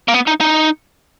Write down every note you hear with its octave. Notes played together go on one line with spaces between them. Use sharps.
A#3
B3
D#4
D#4